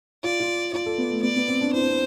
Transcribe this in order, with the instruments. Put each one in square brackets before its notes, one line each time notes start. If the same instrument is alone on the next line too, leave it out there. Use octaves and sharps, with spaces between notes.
[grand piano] F4 [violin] D5
[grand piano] F4
[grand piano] F4 [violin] D5
[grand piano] A4
B3
A3
[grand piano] B3 [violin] D5
[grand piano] B3
C4
D4
[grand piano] E4 [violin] C5
[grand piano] D4
C4